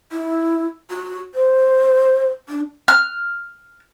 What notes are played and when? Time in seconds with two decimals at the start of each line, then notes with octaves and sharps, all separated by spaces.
0.12 E4
0.90 F#4
1.34 C5
2.49 D4
2.88 F6